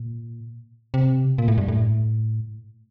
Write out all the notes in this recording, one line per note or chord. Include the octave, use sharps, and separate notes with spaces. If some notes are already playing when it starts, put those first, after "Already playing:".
Already playing: A#2
C3
A#2
A2
G2
A2